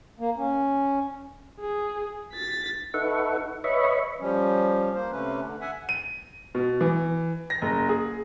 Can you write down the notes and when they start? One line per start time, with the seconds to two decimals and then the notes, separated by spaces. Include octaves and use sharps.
0.20 A#3
0.37 C#4
1.61 G#4
2.33 A6 B6
2.94 D#4 A4 B4 E5 F#5 C#6
3.64 B4 C#5 D#5 E5 B5 C#6
4.20 F3 G3 C#4
4.94 A#3 C5
5.11 C3 A3 C#4 B4
5.43 D3
5.61 E5 F#5 G#5
5.89 D#7
6.55 B2
6.81 E3
7.50 A#6
7.62 F#1
7.89 G#4